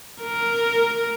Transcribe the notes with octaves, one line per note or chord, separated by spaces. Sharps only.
A#4